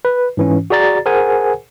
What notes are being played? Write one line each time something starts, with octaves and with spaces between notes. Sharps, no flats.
B4
G#2 E3 C#4
F#4 G#4 D5 A#5 A6
G#4 A#4 C5 F#5 G#5